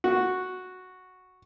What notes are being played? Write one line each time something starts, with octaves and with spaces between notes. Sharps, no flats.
F#4